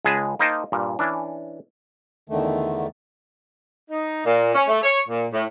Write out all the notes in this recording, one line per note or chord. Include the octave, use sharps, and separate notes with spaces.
C#2 G#3 G#4 B4 A5
A#3 D#4 C5 D#5 G5 A5
G2 A#2
E3 C#4 D4
E2 D3 D#3 A3
D#4
A#2
C#4
A3
C#5
A#2
A2